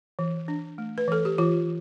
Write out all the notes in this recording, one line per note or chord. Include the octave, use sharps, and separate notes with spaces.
E3
D4
A3
B4
E3 A4
G4
E3 F4